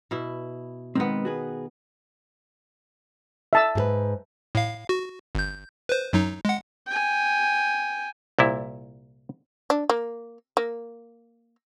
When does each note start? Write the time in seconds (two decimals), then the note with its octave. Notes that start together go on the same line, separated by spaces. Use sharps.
0.11 B2 E4
0.95 D#3 G#3 B3 C4
1.25 F#4 G#4 B4
3.53 E5 A5 E6
3.75 G#2 G#4 B4
4.55 A2 F5
4.89 F#4
5.35 G1 G6
5.89 B4 C5
6.13 F#2 F#3 D#4
6.45 G#3 F#5
6.86 G5 G#5
8.39 C2 A#2 E4
9.70 D4
9.90 A#3
10.57 A#3